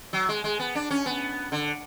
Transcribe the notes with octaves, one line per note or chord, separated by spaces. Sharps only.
F#3
G#3
G#3
B3
D4
C#4
B3
D3